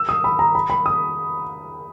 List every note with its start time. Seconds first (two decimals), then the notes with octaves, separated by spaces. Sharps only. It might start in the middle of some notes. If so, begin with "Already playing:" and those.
Already playing: E6
0.09 D#6
0.24 B5
0.39 A#5
0.55 B5
0.70 B5
0.86 D#6